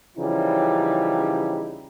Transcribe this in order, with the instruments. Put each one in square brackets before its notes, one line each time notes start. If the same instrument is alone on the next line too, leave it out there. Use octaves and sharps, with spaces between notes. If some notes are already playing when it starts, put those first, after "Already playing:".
[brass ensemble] C#3 E3 F3 G3 D#4